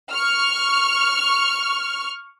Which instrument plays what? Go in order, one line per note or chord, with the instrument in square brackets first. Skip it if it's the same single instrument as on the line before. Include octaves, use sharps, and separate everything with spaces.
[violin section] C#6 F6